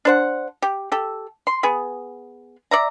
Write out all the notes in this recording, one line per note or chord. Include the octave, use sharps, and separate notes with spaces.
D4 C5 F#5
G4
G4 A4
C6
B3 G#4
D5 E5 A#5